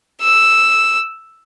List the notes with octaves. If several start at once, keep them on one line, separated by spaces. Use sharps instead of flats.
E6